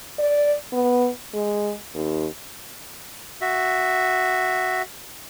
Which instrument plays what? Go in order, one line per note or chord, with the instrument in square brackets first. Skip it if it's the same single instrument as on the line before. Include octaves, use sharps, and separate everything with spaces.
[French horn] D5
B3
G#3
D#2
[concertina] F#4 E5